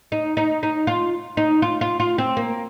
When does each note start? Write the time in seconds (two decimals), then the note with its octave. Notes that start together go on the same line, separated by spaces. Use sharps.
0.12 D#4
0.37 D#4
0.63 D#4
0.87 F4
1.37 D#4
1.62 F4
1.81 F4
2.00 F4
2.18 C4
2.37 A#3